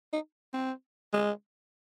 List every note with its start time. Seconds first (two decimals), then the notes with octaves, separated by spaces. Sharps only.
0.13 D#4
0.53 C4
1.13 G#3